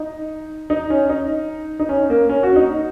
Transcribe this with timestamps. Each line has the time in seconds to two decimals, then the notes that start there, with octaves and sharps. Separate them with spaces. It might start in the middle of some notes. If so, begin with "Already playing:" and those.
Already playing: D#4
0.70 D#4
0.90 C#4
1.09 D#4
1.79 D#4
1.89 C#4
2.10 A#3
2.29 C#4
2.43 F#4
2.56 D#4